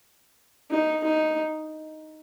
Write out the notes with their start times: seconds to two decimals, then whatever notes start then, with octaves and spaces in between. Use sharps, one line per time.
0.71 D#4
1.04 D#4